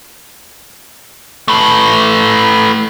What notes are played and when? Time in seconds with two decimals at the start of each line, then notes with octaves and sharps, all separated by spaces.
1.48 A3 B4